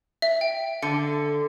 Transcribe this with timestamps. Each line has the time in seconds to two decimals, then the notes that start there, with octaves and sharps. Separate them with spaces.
0.22 E5
0.41 G5
0.82 D3 C#7